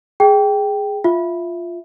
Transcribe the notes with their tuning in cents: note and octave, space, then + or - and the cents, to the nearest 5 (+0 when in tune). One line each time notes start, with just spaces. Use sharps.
G#4 +0 G5 +0
F4 +0 E5 +0